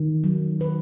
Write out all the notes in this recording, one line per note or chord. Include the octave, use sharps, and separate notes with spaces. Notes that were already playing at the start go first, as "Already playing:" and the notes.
Already playing: D#3
F#3
D#3 B4